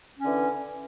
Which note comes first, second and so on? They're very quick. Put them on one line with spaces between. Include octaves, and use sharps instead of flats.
C#4 D3 E3